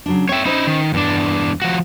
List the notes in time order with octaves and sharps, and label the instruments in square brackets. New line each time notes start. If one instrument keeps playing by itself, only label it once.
[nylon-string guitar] C#3 F#3 D4
[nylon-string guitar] C4 G5 [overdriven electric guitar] C#5 E5
[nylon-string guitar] C#4 C5 [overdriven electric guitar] D#4 E4
[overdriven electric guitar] D#3
[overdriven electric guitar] E2 D4 [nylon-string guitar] G2
[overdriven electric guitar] F3 F#4